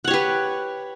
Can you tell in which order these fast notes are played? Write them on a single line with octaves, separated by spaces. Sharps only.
F#5 C#5 G4 B4